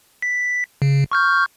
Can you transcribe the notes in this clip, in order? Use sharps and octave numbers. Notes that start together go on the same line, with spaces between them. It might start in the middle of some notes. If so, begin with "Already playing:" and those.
B6
C#3
C#6 F6 G6